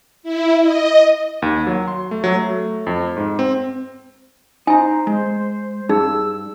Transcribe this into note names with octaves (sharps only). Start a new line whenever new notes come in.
E4
D#5
D#2
F#3
C6
A3
F#3
A3
F2
G#2
C4
D#4 C5 G#5 A#5
G#3
G2 D#4 G#4 E6